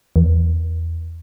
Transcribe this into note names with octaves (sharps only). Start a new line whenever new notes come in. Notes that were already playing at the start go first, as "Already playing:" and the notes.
E2